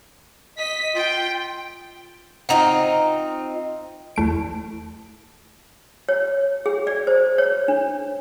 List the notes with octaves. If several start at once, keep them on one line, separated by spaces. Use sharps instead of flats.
D#5 B6
F4 G5
C4 D#4 F4 F#5 A#5
E2 A3 D7
C#5
G#4
D5
C5
C#5
D4